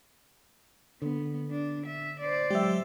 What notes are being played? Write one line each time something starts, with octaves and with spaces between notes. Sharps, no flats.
D3 B3
D4
E5
C5 D5
F#3 G#3 G4 E5